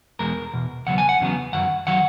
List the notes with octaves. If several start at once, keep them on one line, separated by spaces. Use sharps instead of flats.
E2 B2 G#3 A#4
E2 B2
E2 C#3 F#3 B3 F#5
G#5
F#5
E2 C#3 F#3 B3
F#2 D#3 F#3 F#5
D#3 F#3 F#5